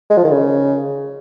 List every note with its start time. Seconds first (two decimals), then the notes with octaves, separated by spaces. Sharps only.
0.10 G#3
0.17 F3
0.24 D#3
0.31 C#3